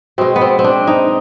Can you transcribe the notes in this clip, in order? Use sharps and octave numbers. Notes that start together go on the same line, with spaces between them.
B2 G#3 C4
B3
C4
C4
D4
D#4